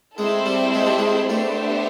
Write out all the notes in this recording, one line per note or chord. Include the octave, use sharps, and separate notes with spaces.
G#3 C4 E4 A4 C5 E5
G3
G#3
G3
G#3
A3 B3 D4 G4 C5 E5